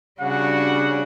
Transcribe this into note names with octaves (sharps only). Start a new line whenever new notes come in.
C#3 G3 D4 F#4 F#5